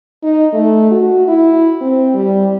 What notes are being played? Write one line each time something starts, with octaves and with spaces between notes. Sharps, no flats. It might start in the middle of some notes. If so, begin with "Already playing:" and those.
D#4
A3
F#4
E4
C4
G3